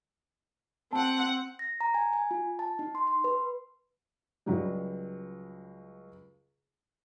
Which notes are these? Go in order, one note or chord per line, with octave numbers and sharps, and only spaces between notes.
C4 F#5 A5
A#6
A#5
G#5
G#5
F4
A5
D#4
C6
C6
B4
C#2 F#3 G3